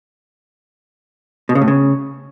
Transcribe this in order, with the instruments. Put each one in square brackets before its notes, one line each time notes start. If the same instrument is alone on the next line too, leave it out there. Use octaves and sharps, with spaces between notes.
[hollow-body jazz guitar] B2
C#3
A2
C#3